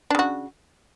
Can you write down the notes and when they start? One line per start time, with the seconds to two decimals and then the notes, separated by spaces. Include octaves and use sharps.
0.10 D4
0.15 C#3
0.19 F#4